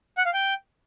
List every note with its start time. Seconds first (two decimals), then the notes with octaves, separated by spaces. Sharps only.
0.18 F#5
0.25 F5
0.33 G5